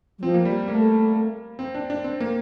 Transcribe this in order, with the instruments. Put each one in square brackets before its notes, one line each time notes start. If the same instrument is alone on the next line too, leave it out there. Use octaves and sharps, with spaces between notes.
[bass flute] G3
[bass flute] F3 [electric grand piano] C4
[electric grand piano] A#3
G3
[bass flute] A3 [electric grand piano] A#3
[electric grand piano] C4
D4
D4
C4
A#3